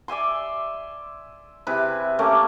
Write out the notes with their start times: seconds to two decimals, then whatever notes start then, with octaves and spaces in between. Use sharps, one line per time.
0.08 D5 E5 G#5 C6
1.67 C3 E4 G#4 B4
2.19 A3 A#3 C#4 G4